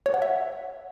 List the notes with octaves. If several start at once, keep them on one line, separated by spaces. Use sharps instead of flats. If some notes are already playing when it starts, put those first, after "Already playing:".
C#5
F#5
E5